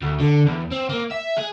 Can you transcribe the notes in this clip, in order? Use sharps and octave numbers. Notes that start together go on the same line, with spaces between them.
D2
D3
E2
C4
A#3
E5
G#4